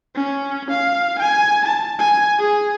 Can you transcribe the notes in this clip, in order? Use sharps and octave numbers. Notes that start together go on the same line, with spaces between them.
C#4
F5
G#5
A5
G#5
G#4